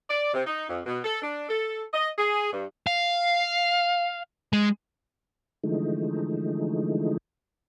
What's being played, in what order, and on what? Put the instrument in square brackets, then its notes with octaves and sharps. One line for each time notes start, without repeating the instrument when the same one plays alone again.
[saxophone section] D5
C3
D#4
F2
B2
A4
D4
A4
D#5
G#4
G2
[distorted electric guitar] F5
G#3
[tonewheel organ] D3 E3 F3 G#3 A3 D#4